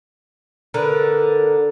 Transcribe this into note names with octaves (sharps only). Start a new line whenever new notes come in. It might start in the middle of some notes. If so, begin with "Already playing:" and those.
D3 A#4 B4